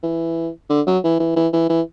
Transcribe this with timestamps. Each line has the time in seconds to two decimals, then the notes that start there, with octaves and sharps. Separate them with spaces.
0.03 E3
0.70 D3
0.87 F#3
1.04 E3
1.20 E3
1.36 E3
1.53 E3
1.70 E3